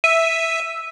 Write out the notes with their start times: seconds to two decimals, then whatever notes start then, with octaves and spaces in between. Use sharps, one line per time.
0.04 E5 D#7